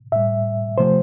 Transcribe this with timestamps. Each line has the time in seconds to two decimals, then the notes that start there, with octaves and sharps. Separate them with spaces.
0.12 A2 G3 E5
0.78 C3 F3 A3 C5